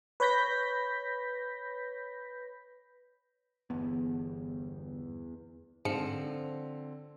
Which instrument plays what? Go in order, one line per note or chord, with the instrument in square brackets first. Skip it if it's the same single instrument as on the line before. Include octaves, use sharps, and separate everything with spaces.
[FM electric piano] B4 C#5 B5 G6 A#6 B6
[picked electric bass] G1 B3 [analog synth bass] E2
[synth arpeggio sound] G#2 C#7 [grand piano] D3 C4 [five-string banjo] F3